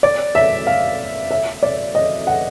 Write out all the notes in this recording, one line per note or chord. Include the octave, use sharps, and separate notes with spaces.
D5
E5
F5
E5
D5
D#5
F#5